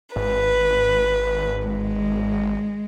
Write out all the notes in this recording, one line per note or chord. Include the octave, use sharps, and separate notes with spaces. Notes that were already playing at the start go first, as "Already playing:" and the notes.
G#1 B4
G#3